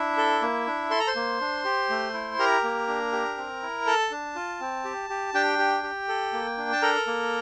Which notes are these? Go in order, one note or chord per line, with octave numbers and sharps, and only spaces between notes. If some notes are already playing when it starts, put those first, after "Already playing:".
Already playing: D4 E4 E5
A4
A#3
D4
A4 C6
A#5
C5 C6
A#3
D4
G4
A3
E4
G4 A#4 A#5
A#3
D4
G4
C4
E4
A4 A5
D4
F4
C4
G4
G4
D4 G4 G5
G4
G4
A4
A#3
D4
A5
A4 A#4 A#5
A#3